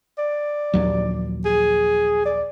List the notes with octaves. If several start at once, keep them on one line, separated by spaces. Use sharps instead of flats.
D5
A#1 D#2 F#3
G#4
D5